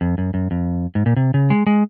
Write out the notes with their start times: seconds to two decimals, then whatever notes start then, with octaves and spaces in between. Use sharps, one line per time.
0.01 F2
0.18 F#2
0.34 F#2
0.51 F2
0.95 G#2
1.06 A#2
1.16 C3
1.34 C#3
1.50 G#3
1.67 G#3